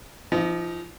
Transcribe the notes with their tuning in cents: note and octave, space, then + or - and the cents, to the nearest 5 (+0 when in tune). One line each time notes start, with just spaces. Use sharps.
F3 -25 D#4 +15